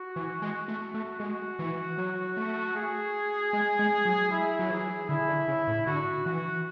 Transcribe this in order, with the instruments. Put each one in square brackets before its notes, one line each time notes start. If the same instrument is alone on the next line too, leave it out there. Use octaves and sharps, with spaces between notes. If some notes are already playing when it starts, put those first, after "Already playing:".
Already playing: [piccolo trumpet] F#4
[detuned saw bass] E3
G#3
A3
A3
[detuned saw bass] G#3 [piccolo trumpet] F#4
[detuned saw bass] E3
F#3
A3
[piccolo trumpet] G#4
[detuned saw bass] G#3
G#3
F#3
[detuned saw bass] G#3 [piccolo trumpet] E4
[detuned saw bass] F#3
[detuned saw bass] E3 [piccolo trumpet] G#4
[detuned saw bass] D3 [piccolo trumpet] E4
[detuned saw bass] D3
C#3
A2
[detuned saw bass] D3 [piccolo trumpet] F#4
[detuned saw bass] E3 [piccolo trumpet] F#4